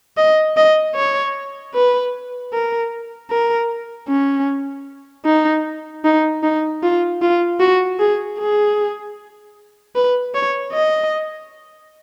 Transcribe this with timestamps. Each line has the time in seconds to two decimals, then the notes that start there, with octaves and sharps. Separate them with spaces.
0.17 D#5
0.57 D#5
0.95 C#5
1.75 B4
2.53 A#4
3.31 A#4
4.08 C#4
5.25 D#4
6.05 D#4
6.43 D#4
6.83 F4
7.22 F4
7.60 F#4
8.00 G#4
8.39 G#4
9.96 B4
10.35 C#5
10.73 D#5